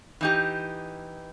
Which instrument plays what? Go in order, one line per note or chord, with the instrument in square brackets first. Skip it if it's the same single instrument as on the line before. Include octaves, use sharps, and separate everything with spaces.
[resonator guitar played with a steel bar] E3 D#4 G4